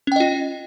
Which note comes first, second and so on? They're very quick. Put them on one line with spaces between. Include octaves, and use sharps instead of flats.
C#4 G5 D#5 F4